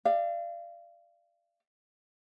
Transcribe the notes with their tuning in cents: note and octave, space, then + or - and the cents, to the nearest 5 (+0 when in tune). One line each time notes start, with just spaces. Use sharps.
D5 +25 F5 -30